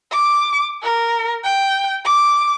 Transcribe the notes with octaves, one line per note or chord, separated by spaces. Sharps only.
D6
A#4
G5
D6